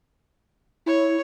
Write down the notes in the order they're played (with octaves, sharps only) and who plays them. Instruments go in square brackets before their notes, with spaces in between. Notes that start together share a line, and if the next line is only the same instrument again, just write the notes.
[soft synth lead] E4 [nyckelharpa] C#5